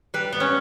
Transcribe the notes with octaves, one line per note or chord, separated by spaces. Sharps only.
G3 B4
B3
C#4